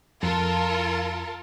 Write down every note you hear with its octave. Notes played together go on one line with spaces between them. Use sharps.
F2 F4 A4 A#4